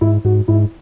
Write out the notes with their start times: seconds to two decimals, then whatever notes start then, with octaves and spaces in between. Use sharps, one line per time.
0.01 G#2 E4
0.25 G#2 F#4
0.48 G#2 E4